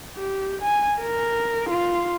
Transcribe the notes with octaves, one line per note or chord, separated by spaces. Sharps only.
G4
G#5
A#4
F4